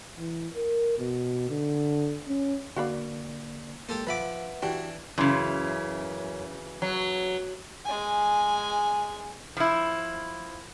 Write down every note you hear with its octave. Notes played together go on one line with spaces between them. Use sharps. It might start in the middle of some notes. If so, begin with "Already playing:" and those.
E3
A#4
B2
D3
C#4
D3 A#3 F#4 D5 F5 B5
G#3 A#3 G4 A4 C5
F3 B4 E5 F#5 B5 D6
E3 D4 F#4 G4
F#2 C#3 E3
F#3
G#3 G#5
F3 E4